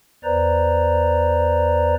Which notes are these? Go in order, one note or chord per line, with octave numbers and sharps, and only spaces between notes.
E2 B4 C5 D5 A#5